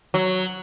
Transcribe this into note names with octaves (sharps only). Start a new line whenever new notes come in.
F#3